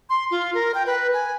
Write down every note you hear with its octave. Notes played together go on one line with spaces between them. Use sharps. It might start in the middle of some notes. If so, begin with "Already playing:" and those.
C6
F4
A#4
G5
B4
G#5